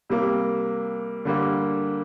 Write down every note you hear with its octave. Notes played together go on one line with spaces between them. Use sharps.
C3 G3 A#3
D3 G3 A#3